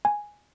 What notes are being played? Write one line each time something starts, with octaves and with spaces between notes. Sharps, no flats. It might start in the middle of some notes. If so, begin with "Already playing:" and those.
G#5